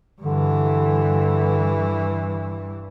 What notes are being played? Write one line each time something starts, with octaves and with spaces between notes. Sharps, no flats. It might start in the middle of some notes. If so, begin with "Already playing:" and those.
G2 D3 E3